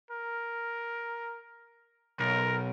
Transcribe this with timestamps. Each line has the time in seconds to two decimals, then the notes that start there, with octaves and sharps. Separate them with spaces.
0.11 A#4
2.19 B1 A#4